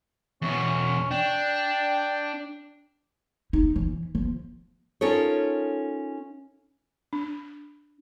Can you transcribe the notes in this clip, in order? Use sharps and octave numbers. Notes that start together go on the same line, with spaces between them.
E2 B2 C#4
D4 G5
D#4
E3
F3
C#4 D#4 F4 A4 A#4 C#5
D4